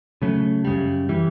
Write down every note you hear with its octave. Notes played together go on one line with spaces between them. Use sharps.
C#3 F#3 A3
F#2 C#3 G3
E3 G3